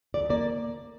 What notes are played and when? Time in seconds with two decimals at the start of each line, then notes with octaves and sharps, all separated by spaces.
0.14 D2 D5
0.30 A#3 D5